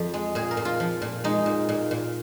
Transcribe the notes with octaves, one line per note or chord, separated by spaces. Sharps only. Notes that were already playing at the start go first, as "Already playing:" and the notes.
Already playing: F2
G#3
A#2 G#4
A#4
A#2
F4
F3
A#2
G#3 D#4
A#2
A#2
A#2